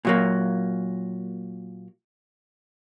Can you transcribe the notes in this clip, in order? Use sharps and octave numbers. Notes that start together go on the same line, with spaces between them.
A#2 F#3 A#3